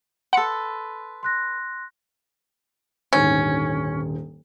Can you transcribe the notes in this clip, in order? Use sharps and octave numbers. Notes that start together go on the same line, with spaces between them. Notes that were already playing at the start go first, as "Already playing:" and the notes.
A4 B4 F#5 C6 C#7
C6 F#6 A#6
D#1 G#2 D3 C#4